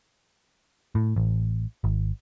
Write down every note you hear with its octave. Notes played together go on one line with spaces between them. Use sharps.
A2
A1
G#1